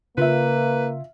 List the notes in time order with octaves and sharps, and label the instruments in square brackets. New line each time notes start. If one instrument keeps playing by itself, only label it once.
[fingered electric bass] C#3 [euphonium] A#3 [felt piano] F4 E5 [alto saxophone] B4